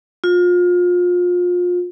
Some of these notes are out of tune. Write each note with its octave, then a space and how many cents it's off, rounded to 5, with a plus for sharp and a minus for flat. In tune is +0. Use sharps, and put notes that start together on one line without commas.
F4 +30